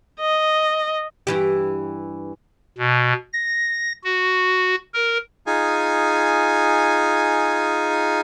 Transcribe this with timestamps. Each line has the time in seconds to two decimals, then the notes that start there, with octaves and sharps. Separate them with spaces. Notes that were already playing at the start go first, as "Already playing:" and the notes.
0.20 D#5
1.27 G2 E3 G4
2.78 B2
3.33 A#6
4.04 F#4
4.94 A#4
5.47 D#4 F4 G#4 G#5